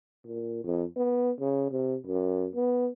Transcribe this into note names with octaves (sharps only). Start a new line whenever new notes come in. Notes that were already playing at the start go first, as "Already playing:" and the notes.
A#2
F2
B3
C#3
C3
F#2
B3